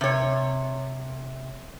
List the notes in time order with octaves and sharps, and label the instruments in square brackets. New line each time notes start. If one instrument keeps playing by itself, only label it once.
[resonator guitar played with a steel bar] C3 C#5